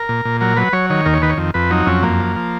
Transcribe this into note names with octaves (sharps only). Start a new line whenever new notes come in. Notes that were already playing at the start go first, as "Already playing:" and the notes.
Already playing: A#4
A#2
A#2
F#3 A#4
F#3 B4
F#3 C#5
D#3 C#5
D#2 A#4
C#5
D#3 B4
C#5
F2
F2 B4
F#3 D#4
F2 C#4
F#2 A#3
F3
F3